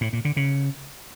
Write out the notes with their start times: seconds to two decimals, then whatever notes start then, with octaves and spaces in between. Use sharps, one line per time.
0.01 A2
0.13 A#2
0.25 D3
0.37 C#3